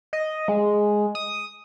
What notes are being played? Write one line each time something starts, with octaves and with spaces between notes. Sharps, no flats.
D#5
G#3
D#6